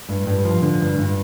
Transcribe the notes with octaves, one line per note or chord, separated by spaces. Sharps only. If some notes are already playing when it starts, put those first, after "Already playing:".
G2
G2
F3
D3
G2
G2